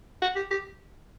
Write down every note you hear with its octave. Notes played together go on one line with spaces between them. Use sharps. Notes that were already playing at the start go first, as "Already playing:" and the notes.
F#4
G4
G4